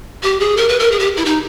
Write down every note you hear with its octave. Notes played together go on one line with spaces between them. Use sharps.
G4
G#4
A#4
B4
A#4
G#4
G4
E4
D#4